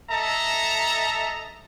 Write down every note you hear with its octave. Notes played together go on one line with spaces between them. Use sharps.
A4 D#5 E5 A5 A#5